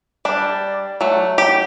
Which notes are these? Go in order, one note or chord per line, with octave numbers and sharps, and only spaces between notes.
G3 D4
F#3 A3
G4